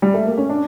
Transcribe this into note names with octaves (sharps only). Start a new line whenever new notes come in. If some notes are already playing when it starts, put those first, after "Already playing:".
G3
A3
A#3
C#4
D4